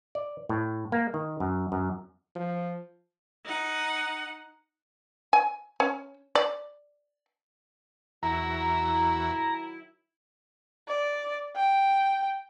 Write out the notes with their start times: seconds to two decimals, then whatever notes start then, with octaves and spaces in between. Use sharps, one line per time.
0.15 D5
0.49 A2
0.92 A#3
1.14 D#3
1.40 F#2
1.72 F#2
2.35 F3
3.45 D#4 F#5
5.33 G#5
5.80 C#4
6.35 D5
8.23 E2 D#3 F#3 E4 F#4 E5 A#5
10.88 D5
11.56 G5